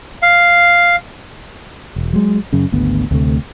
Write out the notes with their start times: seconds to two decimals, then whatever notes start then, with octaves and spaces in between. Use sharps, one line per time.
0.22 F5
1.96 E1
2.13 F#3 G#3
2.53 F#2 C#3
2.72 G#1 D2 B3
3.11 D2 C3 A3